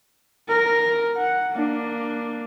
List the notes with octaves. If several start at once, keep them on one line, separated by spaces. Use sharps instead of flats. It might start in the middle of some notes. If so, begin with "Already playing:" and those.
A#4
F#5
A#3 D4